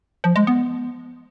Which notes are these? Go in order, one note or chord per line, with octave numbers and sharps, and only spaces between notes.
F3
G#3
B3